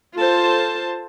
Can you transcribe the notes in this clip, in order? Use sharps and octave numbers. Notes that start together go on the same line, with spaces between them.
F4 A4 C5 A5